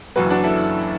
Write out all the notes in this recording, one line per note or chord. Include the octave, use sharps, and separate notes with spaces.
F#1 F#2 E3 F#4 B4
D4 F#4
E4 A4